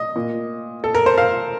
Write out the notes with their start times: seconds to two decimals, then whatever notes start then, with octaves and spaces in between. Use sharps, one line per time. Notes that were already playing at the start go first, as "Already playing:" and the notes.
Already playing: D#5
0.16 A#2
0.84 A4
0.95 A#4
1.06 C5
1.18 F5